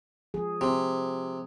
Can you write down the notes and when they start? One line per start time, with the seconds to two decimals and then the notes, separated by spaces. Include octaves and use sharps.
0.34 F3 G#4
0.61 C3